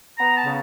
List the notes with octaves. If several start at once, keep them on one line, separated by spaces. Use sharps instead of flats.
B3 A#5
A5
C#3